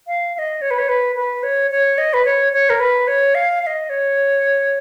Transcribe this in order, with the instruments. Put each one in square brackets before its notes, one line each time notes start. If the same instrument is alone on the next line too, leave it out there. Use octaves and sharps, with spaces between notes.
[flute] F5
F5
D#5
C#5
B4
C#5
B4
B4
C#5
C#5
D#5
B4
C#5
C#5
A#4
B4
C#5
F5
F5
D#5
C#5